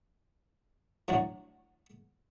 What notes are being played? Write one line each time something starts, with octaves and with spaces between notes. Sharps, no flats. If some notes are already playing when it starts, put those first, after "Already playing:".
A2 D3 F#3 F#4